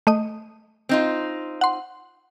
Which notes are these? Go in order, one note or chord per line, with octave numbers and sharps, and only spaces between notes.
A3 D#5 D#6
C4 D#4 F4
F#5 C6